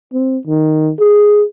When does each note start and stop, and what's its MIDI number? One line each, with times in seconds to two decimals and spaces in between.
0.13 0.38 60
0.47 0.91 51
0.99 1.43 68